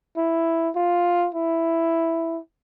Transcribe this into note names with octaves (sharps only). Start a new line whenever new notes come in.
E4
F4
E4